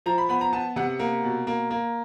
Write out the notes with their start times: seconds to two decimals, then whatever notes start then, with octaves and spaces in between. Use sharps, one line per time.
0.06 F3 A#5
0.18 B5
0.29 B3 B5
0.41 A#5
0.53 B3 A5
0.76 C3 F#5
0.99 A#3
1.24 B2
1.47 A#3
1.70 A#3